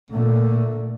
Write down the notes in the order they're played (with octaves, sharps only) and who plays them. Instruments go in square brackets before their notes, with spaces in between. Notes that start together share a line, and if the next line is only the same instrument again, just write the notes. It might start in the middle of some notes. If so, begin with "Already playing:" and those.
[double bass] A#2 D3 [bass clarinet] A3